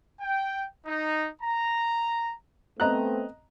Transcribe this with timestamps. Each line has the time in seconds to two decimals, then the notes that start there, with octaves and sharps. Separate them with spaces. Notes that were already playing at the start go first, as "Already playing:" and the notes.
0.21 G5
0.86 D#4
1.42 A#5
2.80 A3 B3 C4 D#5 A#5 F#6